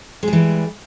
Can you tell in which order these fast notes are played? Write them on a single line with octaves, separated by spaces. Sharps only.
G#3 G3 E3